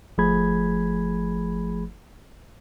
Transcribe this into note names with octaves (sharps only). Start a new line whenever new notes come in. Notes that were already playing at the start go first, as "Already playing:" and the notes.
G1 F3 A3 G#4 B5 G#6